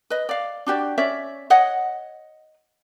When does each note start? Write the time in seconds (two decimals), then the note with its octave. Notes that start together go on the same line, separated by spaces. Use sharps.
0.10 B4 D#5
0.29 D5 F5
0.66 D4 F#4 G4 D5
0.98 C#4 C#5 D5 E5
1.50 C#5 D#5 F#5